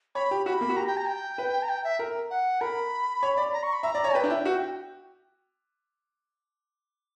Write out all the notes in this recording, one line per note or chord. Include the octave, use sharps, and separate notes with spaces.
C#5 B5
G4
F#4 B5
A#3
F#4
G4 A#5
G5
A#5
G5
B4
A#5
G5
E5
A#4
F#5
A#4 B5
C#5
D5
A#5
C#6
B5
E5 A#5
D5
C#5
B4 G5
D4
E4
F#4